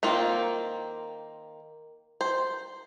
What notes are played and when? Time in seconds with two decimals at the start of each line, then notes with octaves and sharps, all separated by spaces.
0.03 D#3 A#3 C4 F4
2.21 C5